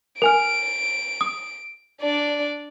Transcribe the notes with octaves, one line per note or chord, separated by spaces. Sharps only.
A#4 G#5 F6 D7
D#6
D4 D5